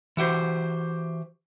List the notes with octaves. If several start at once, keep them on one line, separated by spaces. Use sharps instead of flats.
E3 F#4 G4 C5